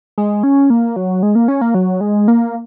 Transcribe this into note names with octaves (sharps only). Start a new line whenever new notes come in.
G#3
C#4
A#3
F#3
G#3
A#3
C#4
A#3
F#3
G#3
A#3